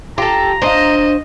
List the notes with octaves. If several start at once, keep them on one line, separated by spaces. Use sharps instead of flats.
F4 G4 A4 A#5
D4 F4 C5 D#5